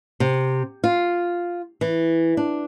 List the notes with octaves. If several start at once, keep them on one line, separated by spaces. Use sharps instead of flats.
C3
F4
E3
D4